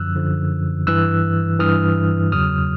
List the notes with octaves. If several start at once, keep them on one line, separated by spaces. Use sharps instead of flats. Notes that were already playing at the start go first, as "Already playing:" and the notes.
Already playing: F#2 D3 F3 E6 F#6
F#2 D3 F3
G2 E3 E6 F#6
G2 E3 D#6 F6
E2 C#3 F#3 D#6 F6